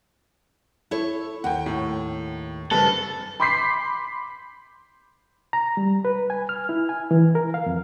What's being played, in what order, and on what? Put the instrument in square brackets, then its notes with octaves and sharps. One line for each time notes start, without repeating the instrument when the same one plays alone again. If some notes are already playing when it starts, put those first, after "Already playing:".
[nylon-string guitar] E4 A4 C#5
[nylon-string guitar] D#2 [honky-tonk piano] F#5 G5
[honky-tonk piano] A2
[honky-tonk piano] F#1 G2 B4 [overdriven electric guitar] A4
[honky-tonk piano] B5 C6 D6 G6 B6 C7
[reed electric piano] A#5
G3
B4
G#5
F6
E4
G#5
E3
A#4
F5
F2